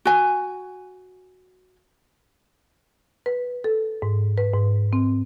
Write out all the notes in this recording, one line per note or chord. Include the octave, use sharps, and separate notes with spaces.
F#4 G#5
B4
A4
G#2
B4
G#2
C4